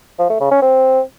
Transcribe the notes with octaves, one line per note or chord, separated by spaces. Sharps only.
F3
A3
C#3
C#4
C4